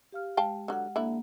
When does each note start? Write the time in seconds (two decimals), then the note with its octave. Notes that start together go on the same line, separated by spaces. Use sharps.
0.12 G4 F5 F6
0.37 G#3 F5 G5 A5
0.68 D3 F#3 F#5 F6
0.96 D3 A#3 E4